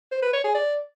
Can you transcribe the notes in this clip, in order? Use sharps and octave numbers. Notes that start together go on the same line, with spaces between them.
C5
B4
C#5
G#4
D5